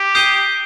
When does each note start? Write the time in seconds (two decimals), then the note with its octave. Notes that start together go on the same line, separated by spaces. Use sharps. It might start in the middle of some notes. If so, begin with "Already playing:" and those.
Already playing: G4
0.15 D#6 G6 C7 D#7 G7